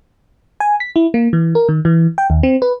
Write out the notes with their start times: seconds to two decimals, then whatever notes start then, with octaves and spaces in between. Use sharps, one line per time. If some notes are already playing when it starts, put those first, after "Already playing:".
0.60 G#5
0.80 B6
0.96 E4
1.14 A#3
1.33 E3
1.55 A#4
1.69 D#3
1.85 E3
2.18 G5
2.30 D#2
2.43 C4
2.62 B4